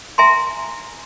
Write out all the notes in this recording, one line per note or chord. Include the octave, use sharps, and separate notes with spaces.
E5 G#5 A#5 C6